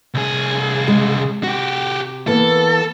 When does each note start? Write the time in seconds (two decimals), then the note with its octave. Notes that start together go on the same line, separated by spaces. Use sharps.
0.14 C2 G#4
0.88 C#3 G#3
1.44 C3 F#4 G4
2.27 E3 A#3 B3 A4